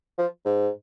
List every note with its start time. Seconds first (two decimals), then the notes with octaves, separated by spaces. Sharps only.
0.18 F3
0.45 G#2